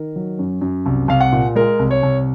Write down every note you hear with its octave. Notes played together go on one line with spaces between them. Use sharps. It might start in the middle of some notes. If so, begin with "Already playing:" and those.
Already playing: D#3 A#4
F#3
F#2
F#2
C2
C2 F5
F#5
A#2
G#3 A#4
C2
C#5
C2